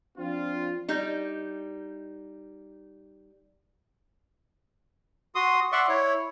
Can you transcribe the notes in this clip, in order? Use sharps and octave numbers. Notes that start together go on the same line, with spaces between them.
F3 C4 D4 F4
G3 D#4
F#4 C6 D#6
D5 E5 F#5 C6 C#6
E4 C#5